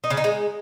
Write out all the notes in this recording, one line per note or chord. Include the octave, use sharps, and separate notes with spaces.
D#4
C#3
D#4
G#3